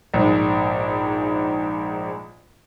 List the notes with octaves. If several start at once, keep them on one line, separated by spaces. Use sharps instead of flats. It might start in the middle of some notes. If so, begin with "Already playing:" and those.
A#1 G#2